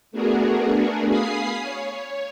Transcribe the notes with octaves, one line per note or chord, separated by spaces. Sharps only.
A3 B3 D4 F#4 G#4 A#4
F5 G#5 B5 D#6 C7
C#5